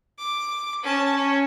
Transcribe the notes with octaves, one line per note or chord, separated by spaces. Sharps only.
D6
C#4 A5
C#4